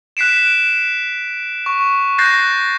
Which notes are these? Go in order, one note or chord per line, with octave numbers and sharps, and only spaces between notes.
F#6 B6 C7 D7 E7
C#6
F#6 G6 A6 A#6 C7